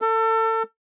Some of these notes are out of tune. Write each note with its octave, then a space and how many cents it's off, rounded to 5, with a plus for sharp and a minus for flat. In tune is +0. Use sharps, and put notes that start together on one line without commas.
A4 +30